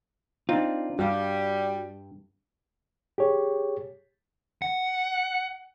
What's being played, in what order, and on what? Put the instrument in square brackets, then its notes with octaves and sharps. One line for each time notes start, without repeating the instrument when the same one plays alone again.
[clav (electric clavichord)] C4 D#4 [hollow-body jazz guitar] D4 F4
[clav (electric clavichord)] G2 [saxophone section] G3 [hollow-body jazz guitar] F#4 F5
[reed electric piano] G4 G#4 C#5
[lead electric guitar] F#5